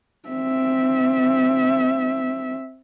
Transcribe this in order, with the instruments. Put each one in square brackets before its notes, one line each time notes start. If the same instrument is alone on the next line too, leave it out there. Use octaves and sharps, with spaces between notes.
[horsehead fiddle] C4 E5